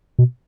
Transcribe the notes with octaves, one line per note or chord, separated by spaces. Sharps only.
B2